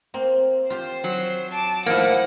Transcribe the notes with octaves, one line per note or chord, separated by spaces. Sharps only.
A#3 C4
F4 G4 C5
F#3
A5 D6
A2 F3 A#3 D#4 F#5